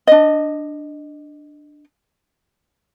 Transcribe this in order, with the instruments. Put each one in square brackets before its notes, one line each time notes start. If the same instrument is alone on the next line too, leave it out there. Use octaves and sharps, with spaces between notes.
[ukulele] D4 D#5